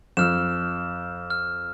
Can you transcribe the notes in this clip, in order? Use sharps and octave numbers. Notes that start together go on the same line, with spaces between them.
F2 E6 F6 E7
F6